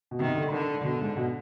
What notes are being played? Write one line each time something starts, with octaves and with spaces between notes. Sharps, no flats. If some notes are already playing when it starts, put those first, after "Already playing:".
B2
C3 D#3
D3
D3 D#3
B2 D3
G#2
B2